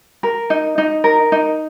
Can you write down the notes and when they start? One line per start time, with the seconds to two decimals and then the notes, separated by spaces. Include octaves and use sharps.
0.23 A#4
0.50 D#4
0.78 D#4
1.04 A#4
1.32 D#4